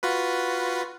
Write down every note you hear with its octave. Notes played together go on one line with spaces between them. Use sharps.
F4 F#4 B4